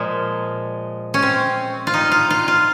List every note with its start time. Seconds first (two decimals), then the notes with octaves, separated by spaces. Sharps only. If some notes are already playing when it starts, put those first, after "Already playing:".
Already playing: A#2 F3 G#3
1.14 C#4
1.22 C4
1.87 F4
1.94 D#4
2.12 F4
2.30 F4
2.48 F4